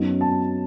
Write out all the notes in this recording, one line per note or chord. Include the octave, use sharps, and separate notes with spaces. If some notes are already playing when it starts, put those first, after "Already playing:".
Already playing: F#2 F#3 B3 D#4
A5